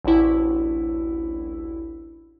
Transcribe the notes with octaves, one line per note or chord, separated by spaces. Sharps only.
A1 D2 E4